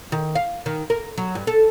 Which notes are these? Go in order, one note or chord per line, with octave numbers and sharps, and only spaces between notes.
D#3
F5
D#3
A#4
F#3
G2
A4